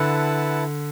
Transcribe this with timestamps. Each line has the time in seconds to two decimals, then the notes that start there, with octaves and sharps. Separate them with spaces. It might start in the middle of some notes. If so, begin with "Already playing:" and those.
Already playing: D3 E4 B4 F#5 A5